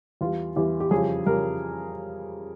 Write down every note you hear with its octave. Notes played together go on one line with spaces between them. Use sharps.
E2 E3 G3 F4
E2 E3 G3 G4
G4
F2 C#3 G3 G#4
F2 C#3 G3 A#4